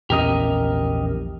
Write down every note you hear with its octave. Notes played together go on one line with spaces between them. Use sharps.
A#1 E2 C#4 G4 A#4 D#5